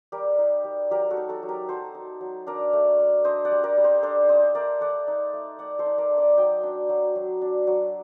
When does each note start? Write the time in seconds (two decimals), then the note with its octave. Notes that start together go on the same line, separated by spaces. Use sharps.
0.12 G3 G4 A#4
0.38 D#4
0.64 G3
0.91 F#3 G4 A#4
1.10 F#4 A4
1.17 D#4
1.29 F#4 A4
1.43 F#3
1.49 G4 A#4
1.69 F#3 A4 C5
1.95 D#4
2.21 F#3
2.47 D4 A#4 D5
2.73 A3
2.99 A3
3.25 D4 C5 D#5
3.45 D5 F#5
3.51 G3
3.64 A#4 D5
3.77 G3
3.84 C5 D#5
4.03 D4 A4 C5
4.29 A3 C5 D#5
4.55 A3 A#4 D5
4.81 A3 D5 F#5
5.08 D#4
5.33 A3
5.59 A3 D5 F#5
5.79 A4 C5
5.86 D#4
5.98 A#4 D5
6.11 A3
6.18 D5 F#5
6.37 F#3 D#5 G5
6.63 D4
6.89 F#3
7.16 F#3
7.42 D4
7.67 F#3